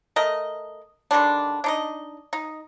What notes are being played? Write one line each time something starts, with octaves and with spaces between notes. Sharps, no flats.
A3 A#4 D#5
D3 D#3 G3 D4
D4 D#4 D#5
D#4